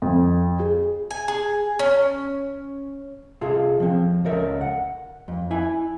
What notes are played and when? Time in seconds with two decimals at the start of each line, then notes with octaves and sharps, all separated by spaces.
0.02 F2
0.59 G#4
1.11 G#5
1.28 G#4
1.79 C#4
3.41 C3 F4 G#4 A4
3.80 F3 C4
4.25 C#2 A4 A#4 E5
4.61 F#5
5.28 F2
5.51 E4 G#5